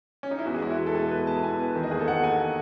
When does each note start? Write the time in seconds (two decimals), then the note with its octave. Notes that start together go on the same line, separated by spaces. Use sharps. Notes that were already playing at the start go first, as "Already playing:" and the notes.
0.23 C#4
0.31 D#4
0.39 E4
0.46 E2 F#4
0.54 G#4
0.62 G#3 F#4
0.71 E4
0.78 E2 F#4
0.86 A4
0.95 B2 G#4
1.02 A4
1.11 E2 B4
1.27 E2 A5
1.43 E2 G#5
1.59 E2 B4
1.75 D#3
1.83 D#5
1.91 D#2 G#4
1.99 A4
2.07 D#2 F#5
2.23 D#2 G#5